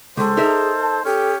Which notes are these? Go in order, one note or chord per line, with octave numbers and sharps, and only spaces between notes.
C#2 G#3 A4 C5
D#4 G#4 A#4 E5
A5
C#4 G4 A4